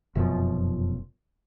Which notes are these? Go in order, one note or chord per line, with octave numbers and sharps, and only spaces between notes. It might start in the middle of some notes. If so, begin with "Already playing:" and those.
F1 F#2 B2 F3